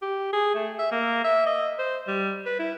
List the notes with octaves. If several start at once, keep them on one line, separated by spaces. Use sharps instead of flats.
G4
G#4
A3
E5
A#3
E5
D#5
C5
G3
B4
E4